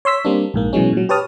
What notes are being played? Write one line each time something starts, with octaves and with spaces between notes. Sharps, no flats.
C#5 C6 E6 B6
G3 A#3 C4 D4
A#1 G#2 A#3
B2 E3 F#3 G#3 C#4
A#2 F#3
G4 B4 C#5 A5 D#6 F6